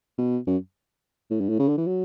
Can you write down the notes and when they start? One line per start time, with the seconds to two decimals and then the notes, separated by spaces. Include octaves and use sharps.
0.18 B2
0.47 F#2
1.31 A2
1.40 G2
1.49 A2
1.59 C#3
1.69 D3
1.78 E3
1.87 F#3